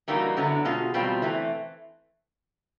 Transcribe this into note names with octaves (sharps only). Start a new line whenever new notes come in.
E3 G3 A#3 D#4 F#4
F#2 D3 F#3 B3 E4
B2 G#3 C#4 F4
E2 B2 G3 C4 F4
E3 A3 C4